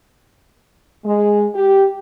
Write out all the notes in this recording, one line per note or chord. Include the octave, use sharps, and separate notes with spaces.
G#3
G4